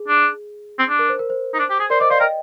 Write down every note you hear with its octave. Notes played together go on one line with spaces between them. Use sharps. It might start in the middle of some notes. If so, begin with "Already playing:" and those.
Already playing: G#4
D4
C4
D4
A#4
C5
A#4
C5
D#4
D4
G4
G#4
A#4 C5 D5
C5 D5 D#5
C5 D5 F5
A#4 D#5 G5